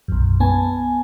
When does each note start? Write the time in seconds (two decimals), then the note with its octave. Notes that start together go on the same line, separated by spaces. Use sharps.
0.08 B1 F#2
0.40 B3 G#5 A5